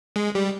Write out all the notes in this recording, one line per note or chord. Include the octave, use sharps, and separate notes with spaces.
G#3
G3